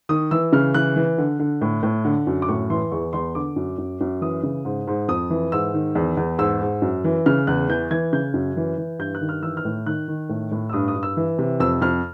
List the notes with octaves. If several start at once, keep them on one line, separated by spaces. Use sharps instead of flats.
D#3 D#6
E3 E6
C#3 F6
E3 F#6
E3
D3
D3
A2
A2
D3
F#2
D6
A2 C#6
E3 C6
E2 C#6
E2 C6
D3 D6
F#2
F#2
F#2
E3 D#6
C#3
G#2
G#2
F2 D#6
E3
G#2 E6
D#3
E2
E2
G#2 E6
G#2
F#2
E3
C#3 F6
E2 F#6
E3 G6
E3 G#6
C#3 G6
F#2
E3
E3
G2 G6
F#6
D#3
F6
E3 E6
F6
A2
D#3 F#6
D#3
A2
A2
E6
G2 D#6
D#6
G2
E6
E3
C3
F2 E6
F2 F6